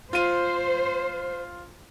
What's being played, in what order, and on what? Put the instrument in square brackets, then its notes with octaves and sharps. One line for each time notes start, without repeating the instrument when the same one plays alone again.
[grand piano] F4 D#7 [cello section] C5